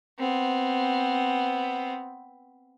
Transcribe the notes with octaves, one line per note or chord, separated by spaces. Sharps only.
B3 C4